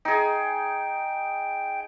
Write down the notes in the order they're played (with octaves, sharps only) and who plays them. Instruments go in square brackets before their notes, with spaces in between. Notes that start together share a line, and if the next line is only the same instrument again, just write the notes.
[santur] D#4 G#4 [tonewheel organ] G5